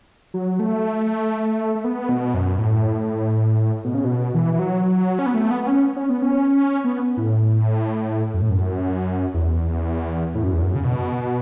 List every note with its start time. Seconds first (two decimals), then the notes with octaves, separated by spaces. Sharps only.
0.34 F#3
0.59 A3
1.75 A3
1.84 B3
2.09 B2
2.34 F#2
2.59 A2
3.84 B2
3.94 C#3
4.04 B2
4.35 E3
4.54 E3
4.59 F#3
5.19 C#4
5.26 B3
5.34 A3
5.51 B3
5.63 B3
5.67 C#4
5.96 C#4
6.09 B3
6.22 C#4
6.84 B3
7.17 A2
8.34 F#2
8.42 A2
8.50 F#2
9.34 E2
10.35 A2
10.43 F#2
10.53 E2
10.63 F#2
10.75 C#3
10.84 B2